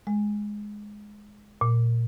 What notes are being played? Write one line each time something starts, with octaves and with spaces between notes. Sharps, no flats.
G#3
A#2